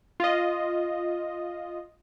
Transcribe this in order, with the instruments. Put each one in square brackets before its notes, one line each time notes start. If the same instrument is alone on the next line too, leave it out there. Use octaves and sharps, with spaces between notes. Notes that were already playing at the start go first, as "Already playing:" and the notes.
[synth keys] F4 D#5